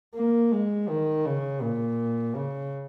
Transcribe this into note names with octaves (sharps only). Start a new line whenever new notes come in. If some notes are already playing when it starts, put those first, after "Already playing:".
A#3
G#3
D#3
C#3
A#2
C#3